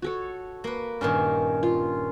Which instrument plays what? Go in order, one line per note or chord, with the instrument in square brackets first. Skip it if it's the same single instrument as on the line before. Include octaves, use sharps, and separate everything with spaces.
[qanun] F#4 A4 C#5
[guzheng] A#3 B4
[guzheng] G2 A#2 D#3 [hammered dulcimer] C#4
[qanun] F4